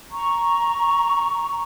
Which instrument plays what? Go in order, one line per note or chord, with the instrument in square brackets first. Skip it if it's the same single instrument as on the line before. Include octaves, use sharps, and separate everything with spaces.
[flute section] A#5 C#6